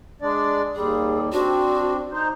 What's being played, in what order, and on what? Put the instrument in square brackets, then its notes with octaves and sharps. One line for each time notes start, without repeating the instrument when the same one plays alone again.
[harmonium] G#3 D4 D5
[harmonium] D#2 G3 [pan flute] G#4
[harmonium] C4 D4 [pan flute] F#4
[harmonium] D#4 C5